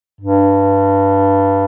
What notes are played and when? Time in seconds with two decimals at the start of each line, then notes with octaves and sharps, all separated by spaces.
0.21 G2